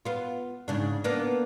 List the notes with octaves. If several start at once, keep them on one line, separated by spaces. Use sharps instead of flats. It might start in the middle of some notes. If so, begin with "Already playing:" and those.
B3 F4
G#2 C#3 D4
A#3 B3 D4